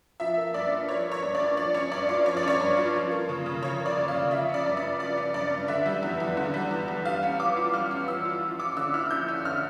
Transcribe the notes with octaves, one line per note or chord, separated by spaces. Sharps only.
F3 E5
A#3
G2 D5
D4
F3 C#5
A#3
C#5
G2
D5
D4
F3 D5
C#4 C#5
G2 D5
F4 D5
F3 C#5
D5
C#4 C#5
G2
F4
F3
A#3
C#3
C#3
F3 C#5
A#3
D5
C#3
F5
C#3
F3 E5
C#4
D5
G2
D5
G2
F3 D5
C#4
G2 D5
G2
D3 E5
G3
E2
E2
D3
G3
E2
E2
G3 F5
C#4
E3 D6
F4
G3 F6
C#4
E3 E6
F4
F3
C#4 D6
D3 E6
E4 F6
F3 G6
C#4
D3 F6